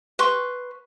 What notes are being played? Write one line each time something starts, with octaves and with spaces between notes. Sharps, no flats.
B4 C6 C#6